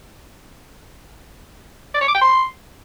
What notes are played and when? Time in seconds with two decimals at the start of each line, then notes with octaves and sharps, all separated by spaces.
1.94 D5
2.01 C#5
2.08 D6
2.15 G5
2.21 C6